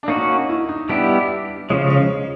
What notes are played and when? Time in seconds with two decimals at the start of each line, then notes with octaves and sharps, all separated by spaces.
0.03 D4
0.08 A#3 C#4 D#4 F#4
0.49 E4
0.69 D#4
0.89 G3 B3 D4 E4 G4
1.69 C#3 F3 G#3 C#4
1.90 C#4